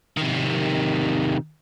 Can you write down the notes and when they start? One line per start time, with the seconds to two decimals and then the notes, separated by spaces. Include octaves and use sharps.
0.17 C3 D#3